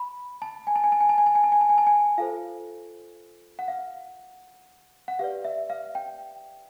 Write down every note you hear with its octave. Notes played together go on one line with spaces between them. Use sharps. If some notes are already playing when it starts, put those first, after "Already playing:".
Already playing: B5
A5
G#5
A5
G#5
A5
G#5
A5
G#5
A5
G#5
A5
G#5
A5
G#5
A5
G#5
F4 A4 C5 F5
F#5
F5
F#5
G4 B4 D5 F5
E5
F5
G5